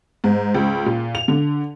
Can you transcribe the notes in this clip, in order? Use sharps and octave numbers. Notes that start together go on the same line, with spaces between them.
G#2
C#2
A#2
F7
D3